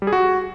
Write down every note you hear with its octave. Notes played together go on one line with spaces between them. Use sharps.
G3
G#4
F#4